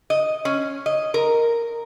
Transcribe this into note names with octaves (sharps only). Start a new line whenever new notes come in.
D#5
C#4
D#5
A#4